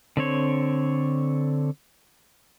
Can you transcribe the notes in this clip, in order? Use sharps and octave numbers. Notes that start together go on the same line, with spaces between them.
D3 C4 C#5